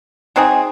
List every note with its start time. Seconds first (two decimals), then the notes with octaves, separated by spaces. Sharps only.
0.36 F#3 C4 D#4 G#4